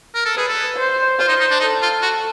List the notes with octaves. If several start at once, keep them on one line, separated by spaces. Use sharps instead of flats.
A#4
A4
G#4 B4
A4
C5
F4 C5
D#4
D#4
D4
D#4 A4
F4
F#4